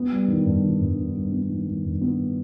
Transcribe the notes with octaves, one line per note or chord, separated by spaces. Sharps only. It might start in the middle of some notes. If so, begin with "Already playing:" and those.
Already playing: B3
G3
D#3
G2
D#3
G2
G2
G2
B3
D#3
D#3
G2
B3